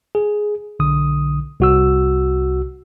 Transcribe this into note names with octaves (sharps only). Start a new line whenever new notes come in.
G#4
B1 D3 D#6
C2 F#4 E6